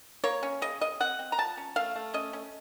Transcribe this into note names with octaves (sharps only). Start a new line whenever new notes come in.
A#3 C#5
C#4
C#3 D#5
C#3 D#5
C4 F#5
C4
A#5
F3 A5
C#4
A3 F5
A3
C#4 D#5
C#4